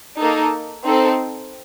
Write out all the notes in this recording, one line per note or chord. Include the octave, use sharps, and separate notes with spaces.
A#3 D#4 A4
C4 D#4 A4